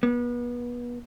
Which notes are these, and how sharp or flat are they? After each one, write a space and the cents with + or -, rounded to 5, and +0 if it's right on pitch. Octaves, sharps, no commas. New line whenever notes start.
B3 -30